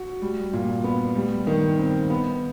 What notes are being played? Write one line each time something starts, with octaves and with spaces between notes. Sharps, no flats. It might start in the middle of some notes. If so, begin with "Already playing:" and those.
Already playing: F#4
G3
A#2
B3
G3
D#3
C4
B3